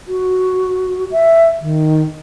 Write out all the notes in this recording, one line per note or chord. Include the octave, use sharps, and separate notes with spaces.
F#4
E5
D#3